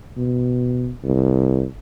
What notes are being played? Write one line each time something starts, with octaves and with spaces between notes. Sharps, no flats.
B2
C2